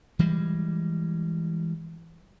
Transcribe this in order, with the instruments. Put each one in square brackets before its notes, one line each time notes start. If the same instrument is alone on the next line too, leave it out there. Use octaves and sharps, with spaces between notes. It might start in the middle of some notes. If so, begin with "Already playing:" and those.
[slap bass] E3 G3 G#3